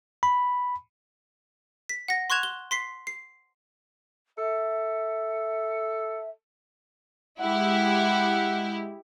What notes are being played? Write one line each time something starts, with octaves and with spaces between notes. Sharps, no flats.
B5
B6
F#5 A#6
C6 C#6 F#6 G#6 E7 F7
G7
C6 B6 C7
C7
A4 E5
G#3 E4 G4 F#5